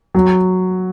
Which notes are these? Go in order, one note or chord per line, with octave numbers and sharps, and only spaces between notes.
F#3